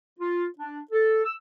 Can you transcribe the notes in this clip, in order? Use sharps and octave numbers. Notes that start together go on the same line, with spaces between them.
F4
D4
A4
E6